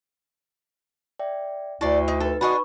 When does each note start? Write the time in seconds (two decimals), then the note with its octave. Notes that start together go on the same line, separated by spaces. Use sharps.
1.19 D5 E5 G5
1.81 D2 E4 D5 A5 C#6 C7
2.08 D#4
2.20 D#4 A4 B4
2.41 D4 F#4 G#4 D#5 B5 C#6